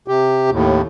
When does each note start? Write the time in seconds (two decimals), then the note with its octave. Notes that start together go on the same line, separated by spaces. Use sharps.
0.08 C3 G4
0.50 D#2 A2